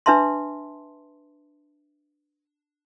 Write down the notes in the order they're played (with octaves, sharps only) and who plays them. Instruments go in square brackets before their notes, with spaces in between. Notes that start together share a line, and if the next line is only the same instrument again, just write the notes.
[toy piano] D4 B4 E5 A5 C6